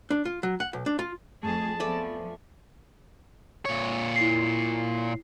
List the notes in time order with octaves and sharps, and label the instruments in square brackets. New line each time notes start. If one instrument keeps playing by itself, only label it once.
[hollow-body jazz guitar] D4
F4
F#3
F#5
B1
D4
F4
[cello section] F2 G#4 [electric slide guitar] A3 [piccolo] A5
[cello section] F3 B3 [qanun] A3 D5 B5 [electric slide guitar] G#5
[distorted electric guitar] A#2 C#5
[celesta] E4 C7